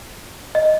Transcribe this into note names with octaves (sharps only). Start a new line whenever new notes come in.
D#5